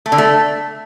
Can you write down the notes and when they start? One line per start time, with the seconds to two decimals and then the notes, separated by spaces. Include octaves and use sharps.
0.06 A3
0.12 D3
0.18 A3